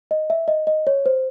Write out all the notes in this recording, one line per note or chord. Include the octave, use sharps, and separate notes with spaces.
D#5
E5
D#5
D#5
C#5
C5